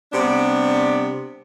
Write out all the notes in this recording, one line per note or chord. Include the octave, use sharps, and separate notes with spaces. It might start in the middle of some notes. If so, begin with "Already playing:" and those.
C3 G3 B3 D4